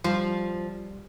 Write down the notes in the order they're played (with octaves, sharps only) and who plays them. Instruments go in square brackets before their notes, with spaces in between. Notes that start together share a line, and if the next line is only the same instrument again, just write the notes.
[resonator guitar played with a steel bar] F3 [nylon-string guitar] G3